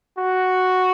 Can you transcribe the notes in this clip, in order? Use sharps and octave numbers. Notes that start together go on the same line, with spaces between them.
F#4